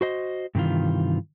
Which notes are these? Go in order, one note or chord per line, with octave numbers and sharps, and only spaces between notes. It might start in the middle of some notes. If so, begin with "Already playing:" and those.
F#4 C5 D#5
G2 C3 D#3 E3 F4